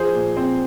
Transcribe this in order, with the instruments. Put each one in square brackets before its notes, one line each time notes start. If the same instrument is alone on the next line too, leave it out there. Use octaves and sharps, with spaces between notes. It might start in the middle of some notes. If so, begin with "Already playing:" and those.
Already playing: [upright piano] F3 G#4 C5
A#2
C4